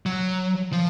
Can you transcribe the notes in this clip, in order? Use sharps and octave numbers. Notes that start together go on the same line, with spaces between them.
F#3
F3